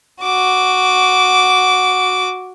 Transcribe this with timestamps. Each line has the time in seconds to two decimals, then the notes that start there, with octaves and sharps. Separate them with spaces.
0.23 F#4 D6